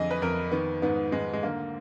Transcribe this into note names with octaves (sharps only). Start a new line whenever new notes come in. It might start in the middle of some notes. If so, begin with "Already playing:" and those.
Already playing: F2 D3 G#4 D#5
B4
F2 A#4
D#3 B3
G#2 B3
G#2 G#3
G#3
D3 A#3